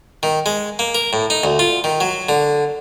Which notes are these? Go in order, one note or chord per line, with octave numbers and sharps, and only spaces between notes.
D#3
G#3
A#3
A#4
A2
D#4
D2
F4
D#3
F#3
D3